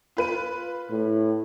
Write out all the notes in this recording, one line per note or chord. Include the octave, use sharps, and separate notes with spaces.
F4 B4 D#7
A2